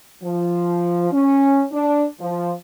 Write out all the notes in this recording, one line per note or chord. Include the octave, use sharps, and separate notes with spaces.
F3
C#4
D4
F3